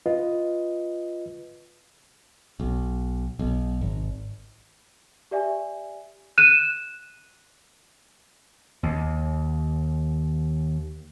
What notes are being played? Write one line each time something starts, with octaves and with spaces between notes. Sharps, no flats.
F4 B4 D#5
B1
B1
G#1
G4 D5 E5 G#5
F#6 D#7 E7
D#2 D#3